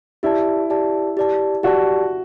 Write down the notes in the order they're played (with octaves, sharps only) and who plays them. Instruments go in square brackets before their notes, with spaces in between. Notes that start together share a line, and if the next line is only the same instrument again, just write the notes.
[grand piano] E4 [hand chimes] G4 D5 A5
[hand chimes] G4 D5 A5
G4 D5 A5
[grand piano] F#4 [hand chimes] G4 D5 A5